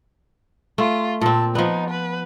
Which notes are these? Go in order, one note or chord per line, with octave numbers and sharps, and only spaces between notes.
A3 F4
A#2 C4 A5
F3 B3 D#4
B4